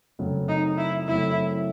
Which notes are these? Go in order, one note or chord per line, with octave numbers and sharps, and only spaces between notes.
F#2 C#3 F#3 A3 C4
D#4
E4
F#2 C#3 F#3 A3 C4 E4